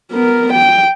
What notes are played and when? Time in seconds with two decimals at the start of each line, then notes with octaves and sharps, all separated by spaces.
0.12 B3 A#4
0.53 G5